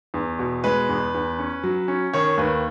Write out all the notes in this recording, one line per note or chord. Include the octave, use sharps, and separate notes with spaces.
E2
B2
G#3 B4
E2
E2
C#4
F#3
C#4
D#3 C#5
D#2 B4